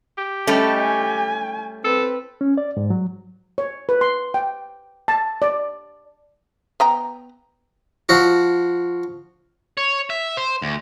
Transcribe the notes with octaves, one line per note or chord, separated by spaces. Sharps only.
G4
G3 A3 C#4 D#5 A5
G#5
C4 A4 B4
C#4
D5
G#2
F#3
C#5
B4
C6
G5
A5
D5
B3 G5 A#5
F3 F#4
C#5
E5
C5
D2